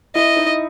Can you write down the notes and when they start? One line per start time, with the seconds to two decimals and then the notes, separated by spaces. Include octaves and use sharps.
0.15 E4 D#5
0.37 D#4